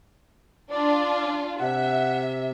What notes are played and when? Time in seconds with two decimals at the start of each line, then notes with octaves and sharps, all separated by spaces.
0.71 D4 F4 D5
1.60 C3 E5 F#5